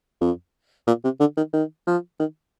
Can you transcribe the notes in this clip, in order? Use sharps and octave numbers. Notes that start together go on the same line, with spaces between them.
F2
A#2
C3
D3
D#3
D#3
F3
D#3